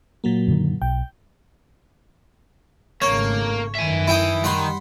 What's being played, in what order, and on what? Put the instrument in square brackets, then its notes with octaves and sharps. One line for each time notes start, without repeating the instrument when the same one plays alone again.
[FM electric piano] A#2 F#3 A#3
[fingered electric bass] F#2 D3 D#3
[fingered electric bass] B1 [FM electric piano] G5
[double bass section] G#1 C#3 A3 [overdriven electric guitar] A#3 [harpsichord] C#5
[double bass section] F#2 D#3 [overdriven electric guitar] E5 G#5
[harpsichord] E4 G5 D#6
[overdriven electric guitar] D#3 [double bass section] G3 [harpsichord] F#5 B5 C6